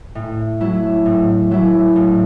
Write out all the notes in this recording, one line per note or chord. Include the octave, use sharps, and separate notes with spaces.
A2
F#3 A3 E4
A2
F#3 A3 E4
A2